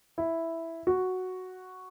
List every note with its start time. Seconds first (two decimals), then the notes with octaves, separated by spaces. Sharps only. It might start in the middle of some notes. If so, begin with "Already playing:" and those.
0.18 E4
0.87 F#4